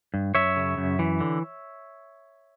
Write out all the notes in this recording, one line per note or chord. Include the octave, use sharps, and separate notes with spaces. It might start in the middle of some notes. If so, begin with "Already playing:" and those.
G2
F#2 C#5 E5
C#3
F#2
E3
D3